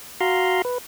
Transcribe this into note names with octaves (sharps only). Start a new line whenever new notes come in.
F#4 F5 A#5 C6
B4